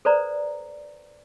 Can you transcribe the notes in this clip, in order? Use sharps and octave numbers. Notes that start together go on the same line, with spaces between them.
A4 B4 C5 D5 A#5